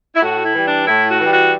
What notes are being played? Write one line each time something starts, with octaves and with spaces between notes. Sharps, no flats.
E4
A2 F#4
E4
E3 G3
D4
A2 E4
F#4
E3 G3
F#4